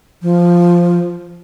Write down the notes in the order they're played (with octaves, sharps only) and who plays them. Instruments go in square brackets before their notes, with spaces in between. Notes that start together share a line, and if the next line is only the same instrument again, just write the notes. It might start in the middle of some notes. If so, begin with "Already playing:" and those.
[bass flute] F3